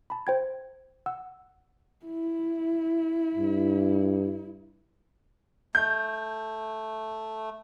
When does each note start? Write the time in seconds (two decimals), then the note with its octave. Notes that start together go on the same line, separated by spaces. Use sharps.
0.10 A5 B5
0.27 C5 G5 G#6
1.06 F#5 E6
2.06 E4
3.37 G2
5.75 A3 G6